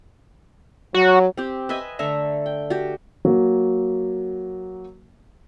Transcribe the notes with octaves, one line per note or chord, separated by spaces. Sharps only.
F#3 F#4
C4 G4
B4 D#5 E5 G#5
D3 A3 E5 A#5
G5
F#4 G4
F#3 A#3